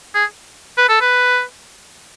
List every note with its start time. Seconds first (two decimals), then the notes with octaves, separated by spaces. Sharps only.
0.15 G#4
0.77 B4
0.89 A4
1.01 B4